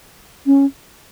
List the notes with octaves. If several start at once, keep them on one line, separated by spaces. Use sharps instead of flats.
C#4